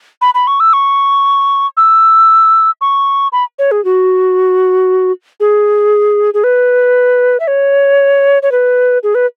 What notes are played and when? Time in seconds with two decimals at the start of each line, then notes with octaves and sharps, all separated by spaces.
0.22 B5
0.35 B5
0.47 C#6
0.60 E6
0.73 C#6
1.77 E6
2.81 C#6
3.32 B5
3.59 C#5
3.71 G#4
3.85 F#4
5.40 G#4
6.34 G#4
6.44 B4
7.40 E5
7.48 C#5
8.43 C#5
8.52 B4
9.03 G#4
9.15 B4